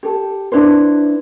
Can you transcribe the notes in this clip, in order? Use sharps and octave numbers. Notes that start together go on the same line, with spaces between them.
G4 A4
D4 E4 B4 C5